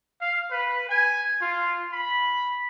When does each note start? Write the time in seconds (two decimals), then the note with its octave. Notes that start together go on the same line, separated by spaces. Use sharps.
0.21 F5
0.51 B4
0.89 G#5
1.41 F4
1.92 B5